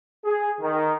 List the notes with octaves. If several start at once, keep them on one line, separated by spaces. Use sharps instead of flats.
G#4
D#3